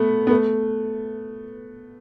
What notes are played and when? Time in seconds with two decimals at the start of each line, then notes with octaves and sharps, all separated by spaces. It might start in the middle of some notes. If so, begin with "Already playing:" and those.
Already playing: A3 B3
0.27 B3
0.31 A3